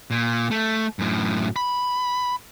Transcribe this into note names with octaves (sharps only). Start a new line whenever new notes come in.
A#2
A3
F#2 A2
B5